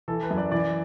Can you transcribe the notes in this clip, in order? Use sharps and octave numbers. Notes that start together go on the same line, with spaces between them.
E3 A4
B4
F#2
D5
E3 D5